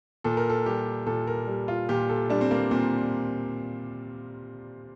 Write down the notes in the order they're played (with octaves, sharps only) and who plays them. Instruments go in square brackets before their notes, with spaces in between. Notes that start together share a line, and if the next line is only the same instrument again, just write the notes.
[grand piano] A#2 A4
A#4
A4
G3 G4
A#2 A4
A#4
G3
F4
A#2 G4
A4
G3 D4
C4
A#3
A#2 C4